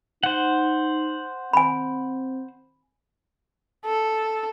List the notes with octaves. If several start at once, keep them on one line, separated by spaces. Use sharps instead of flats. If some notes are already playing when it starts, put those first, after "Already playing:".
D#4 C5 F#5
C4 G#5 B5
A4